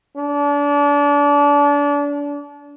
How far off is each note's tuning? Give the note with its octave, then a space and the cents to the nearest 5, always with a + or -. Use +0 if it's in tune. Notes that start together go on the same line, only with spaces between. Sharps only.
D4 -30